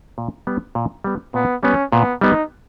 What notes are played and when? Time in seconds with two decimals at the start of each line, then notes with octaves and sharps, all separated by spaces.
0.18 A#2
0.47 G3 B3
0.75 A#2
1.04 G3 B3
1.34 A#2 B3
1.63 G3 B3 C#4
1.92 A#2 B3
2.21 G3 B3 D#4